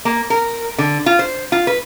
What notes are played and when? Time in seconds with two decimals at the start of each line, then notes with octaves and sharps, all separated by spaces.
0.05 A#3
0.30 A#4
0.78 D3
1.06 F4
1.19 C5
1.52 F4
1.67 B4